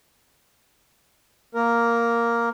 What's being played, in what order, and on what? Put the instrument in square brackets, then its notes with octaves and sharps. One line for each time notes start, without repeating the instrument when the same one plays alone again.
[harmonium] A#3 A#4